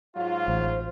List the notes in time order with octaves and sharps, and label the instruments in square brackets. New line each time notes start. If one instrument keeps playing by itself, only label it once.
[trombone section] G#2 F#3 F4 [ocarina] F5
[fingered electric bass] A1 [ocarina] C5